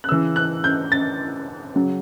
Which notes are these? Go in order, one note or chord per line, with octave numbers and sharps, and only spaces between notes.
F#6
C#3 E3 E6
F#6
G6
A6
C#3 F#3